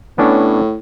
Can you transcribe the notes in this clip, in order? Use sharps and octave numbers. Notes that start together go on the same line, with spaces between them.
A2 B3 C#4 D4